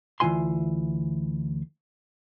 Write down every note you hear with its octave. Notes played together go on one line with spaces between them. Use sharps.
D2 E3 G#3 F4 G#5 C6